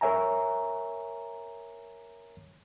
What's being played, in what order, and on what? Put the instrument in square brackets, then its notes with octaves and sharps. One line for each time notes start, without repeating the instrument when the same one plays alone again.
[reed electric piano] A#4 C#5 E5 G#5 A#5